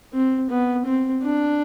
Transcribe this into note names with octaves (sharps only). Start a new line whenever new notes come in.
C4
B3
C4
D4